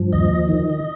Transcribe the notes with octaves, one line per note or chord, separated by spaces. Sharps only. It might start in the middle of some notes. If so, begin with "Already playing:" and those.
Already playing: G2 F3
D#2 D#5
D#3